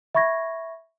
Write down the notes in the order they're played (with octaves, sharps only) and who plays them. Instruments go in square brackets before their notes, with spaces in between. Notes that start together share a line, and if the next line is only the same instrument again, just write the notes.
[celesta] E5 B5 C#6 G#6 A#6